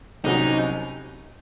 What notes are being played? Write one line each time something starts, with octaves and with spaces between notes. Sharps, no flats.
C2 C3 F#3 C#4 D#4